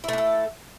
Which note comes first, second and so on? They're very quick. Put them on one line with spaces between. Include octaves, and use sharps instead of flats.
E4 A3 D4 A4